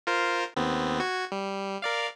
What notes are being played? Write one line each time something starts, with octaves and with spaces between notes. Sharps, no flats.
F4 A#4 C5
D#2 B3 C4
F#4 G#6
G3
A#4 D5 F5